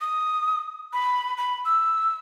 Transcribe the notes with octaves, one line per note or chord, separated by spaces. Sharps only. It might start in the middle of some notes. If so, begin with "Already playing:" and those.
D#6
B5
B5
E6